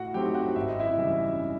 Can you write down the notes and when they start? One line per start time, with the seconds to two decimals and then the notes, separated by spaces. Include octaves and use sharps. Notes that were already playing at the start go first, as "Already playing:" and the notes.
Already playing: A2 F#4 F#5
0.14 F#3 A3 C4 D#4 G4 G5
0.35 F#4 F#5
0.56 G#1 E5
0.69 D#5
0.80 E4 E5
0.97 F#2 C#3 E3 G3